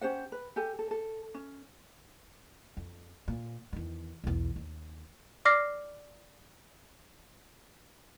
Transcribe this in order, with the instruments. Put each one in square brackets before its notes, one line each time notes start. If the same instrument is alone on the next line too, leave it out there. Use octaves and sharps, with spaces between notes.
[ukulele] C#4 G4 C5 F#5
B4
G4 A4 G#5
A4
A4
C#4
[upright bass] F2
A#2
E2 D#3
B1 E2
D#2
[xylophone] D5 D6 F6 A#6 C7